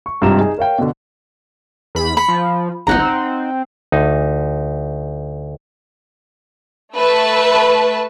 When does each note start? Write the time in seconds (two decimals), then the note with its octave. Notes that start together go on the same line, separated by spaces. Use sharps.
0.06 C#6
0.21 G#1 G2 C3 F4 A#5 E7
0.38 D#4 G#4
0.57 A#4 C#5 F5 G5
0.78 B2 D3
1.95 E2 B5
2.17 B5 C#7
2.28 F3
2.87 G#1 C#2 D#4 F#5 A#5
2.99 C4
3.92 D2 D#4
6.96 A3 B4 E5 A5